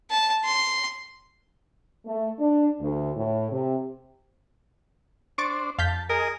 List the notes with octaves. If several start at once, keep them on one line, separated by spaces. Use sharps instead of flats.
A5
C6
A3
D4
D2
A2
C3
D4 C5 C#6 D6 A6
F2 F5 A5 G6 B6
G#4 A#4 D#5